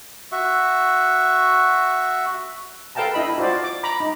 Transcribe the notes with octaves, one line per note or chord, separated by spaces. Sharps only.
F#4 E5 C#6
A4 B4 F5 G5 A5 A#5
D4 E4 D#5 B5
F4 F#4 C5 D5
D6
A#5 B5 D6
D#4